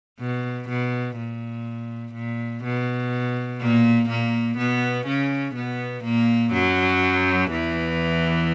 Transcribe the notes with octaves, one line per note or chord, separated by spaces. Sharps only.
B2
B2
A#2
A#2
B2
A#2 A#3
A#2 A#3
B2 B3
C#3 C#4
B2 B3
A#2 A#3
F#2 F#3
E2 E3